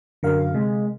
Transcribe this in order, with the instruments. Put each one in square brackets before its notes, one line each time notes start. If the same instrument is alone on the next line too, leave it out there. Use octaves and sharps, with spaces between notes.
[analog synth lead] F#2 [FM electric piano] D3 A#4 F5
[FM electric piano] C3 [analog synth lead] G#3